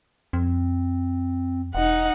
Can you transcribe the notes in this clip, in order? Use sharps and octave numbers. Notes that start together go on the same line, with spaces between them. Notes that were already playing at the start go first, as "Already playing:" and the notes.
F2 C4
E1 D#4 F#5